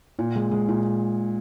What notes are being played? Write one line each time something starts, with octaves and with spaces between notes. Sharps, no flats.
A#2
G#3
G#3
A#2